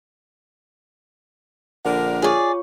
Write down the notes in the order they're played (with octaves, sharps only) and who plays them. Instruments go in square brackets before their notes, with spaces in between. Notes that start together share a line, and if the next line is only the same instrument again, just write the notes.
[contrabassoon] A#1 [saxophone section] D3 D4 A#4 [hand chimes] F#5
[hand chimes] F4 C#5 C#6 [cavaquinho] G#4 D5